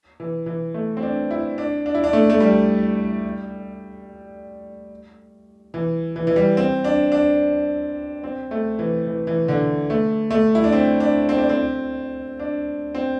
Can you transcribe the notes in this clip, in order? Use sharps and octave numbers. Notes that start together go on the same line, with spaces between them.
E3
E3
A3
C4
D4
E4
D4
D4
E4
D4
A3
A3
G3
E3
E3
E3
G3
C4
D4
D4
C4
A3
E3
E3
E3
D3
A3
A3
E4
D4
C4
D4
C4
D4
C4
D4
C4